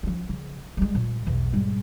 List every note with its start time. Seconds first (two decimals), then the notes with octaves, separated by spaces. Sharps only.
0.03 F3 C#4
0.29 C#3
0.77 G3 G#3
0.95 A#2
1.27 B1 E2
1.53 G#2 G3